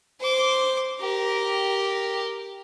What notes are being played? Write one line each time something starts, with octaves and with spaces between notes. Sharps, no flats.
C5 D6
G4 A#4